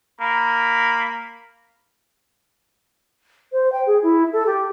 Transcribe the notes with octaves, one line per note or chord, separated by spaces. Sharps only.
A#3 B5
C5
G5
G#4
E4
A4
G4